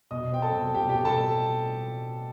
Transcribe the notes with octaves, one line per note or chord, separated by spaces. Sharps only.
B2 D#5 D#6
C4 G5
A4 A5
B2
B2 G4 G5
G4 G5
B2
A4 A5